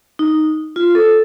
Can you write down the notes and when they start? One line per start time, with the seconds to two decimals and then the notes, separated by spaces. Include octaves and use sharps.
0.19 D#4
0.76 F4
0.95 A4